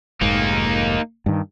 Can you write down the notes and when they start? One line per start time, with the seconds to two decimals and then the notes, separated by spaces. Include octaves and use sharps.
0.21 F1 G#2 A#3 D#4
1.26 G2 D#3